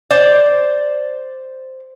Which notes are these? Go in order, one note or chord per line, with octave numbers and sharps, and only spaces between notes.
C5 D5